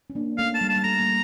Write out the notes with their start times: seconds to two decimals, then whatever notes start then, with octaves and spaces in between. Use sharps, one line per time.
0.10 C#4
0.15 A#3 D4
0.38 A3 C#4 F5
0.54 A5
0.61 G3
0.69 A5
0.76 G3
0.84 A3 A#5
0.99 G3 A#3